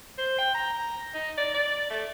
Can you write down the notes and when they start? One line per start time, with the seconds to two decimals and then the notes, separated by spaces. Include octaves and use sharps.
0.18 C5
0.38 G5
0.54 A#5
1.14 D#4
1.37 D5
1.54 D5
1.90 A3